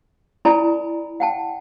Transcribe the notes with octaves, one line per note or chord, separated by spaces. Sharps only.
E4 A4 D5 G#5 A#5 B5
F#5 G5 A5